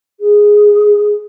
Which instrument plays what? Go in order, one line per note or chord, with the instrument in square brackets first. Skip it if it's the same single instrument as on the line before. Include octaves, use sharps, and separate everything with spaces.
[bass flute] G#4